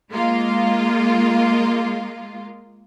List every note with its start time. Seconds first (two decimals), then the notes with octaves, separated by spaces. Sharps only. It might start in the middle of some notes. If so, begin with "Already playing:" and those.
0.11 G#3 A#3 F4